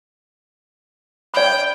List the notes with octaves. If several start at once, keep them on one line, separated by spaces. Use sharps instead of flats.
D5 G5 B5